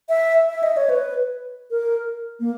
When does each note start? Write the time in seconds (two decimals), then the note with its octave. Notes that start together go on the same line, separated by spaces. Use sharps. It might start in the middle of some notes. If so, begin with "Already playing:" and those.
0.09 E5
0.50 E5
0.63 D#5
0.77 C#5
0.89 B4
1.71 A#4
2.40 A#3